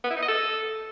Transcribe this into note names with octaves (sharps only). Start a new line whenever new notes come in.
B3
E4
D#4
D#5
A4